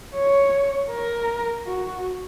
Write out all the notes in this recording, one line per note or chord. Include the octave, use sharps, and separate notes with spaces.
C#5
A#4
F#4